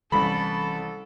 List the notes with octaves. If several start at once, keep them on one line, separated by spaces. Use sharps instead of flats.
C2 E3 C#4 A4 B5